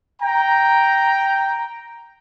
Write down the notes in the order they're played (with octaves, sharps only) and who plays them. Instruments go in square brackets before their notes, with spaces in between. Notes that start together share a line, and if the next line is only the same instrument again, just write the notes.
[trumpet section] G5 A#5